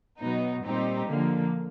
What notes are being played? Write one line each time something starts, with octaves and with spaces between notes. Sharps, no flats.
B2 F#3 B3 D#4
A#2 G3 C4 D#4 G4
D3 F3 A#3